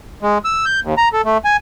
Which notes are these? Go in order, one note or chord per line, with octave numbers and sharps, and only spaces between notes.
G#3
E6
G6
D#2
A#5
A4
A3
G#5